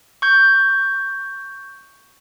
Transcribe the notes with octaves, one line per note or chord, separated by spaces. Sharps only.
C#6 G6